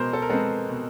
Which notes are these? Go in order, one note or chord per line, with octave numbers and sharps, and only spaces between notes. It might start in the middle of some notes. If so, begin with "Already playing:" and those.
Already playing: B2 G#3 A#4 C5
A4
A#4
G#3 C4 A4 B4
B2